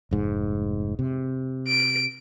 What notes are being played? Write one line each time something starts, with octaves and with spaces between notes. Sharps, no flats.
F1 G#2
C3
D7